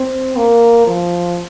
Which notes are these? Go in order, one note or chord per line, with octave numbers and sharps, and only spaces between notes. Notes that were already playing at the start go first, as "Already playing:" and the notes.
Already playing: C4
A#3
F3